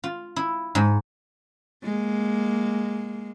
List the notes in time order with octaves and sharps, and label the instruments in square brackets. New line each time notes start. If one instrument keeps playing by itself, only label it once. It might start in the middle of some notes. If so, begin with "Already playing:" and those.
[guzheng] F4
E4
G#2
[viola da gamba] G#3 A#3